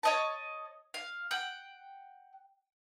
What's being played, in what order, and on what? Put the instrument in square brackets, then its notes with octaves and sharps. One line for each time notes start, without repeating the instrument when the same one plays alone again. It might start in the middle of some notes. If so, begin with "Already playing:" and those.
[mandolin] C#5 D#5 A5
F5
F#5 G5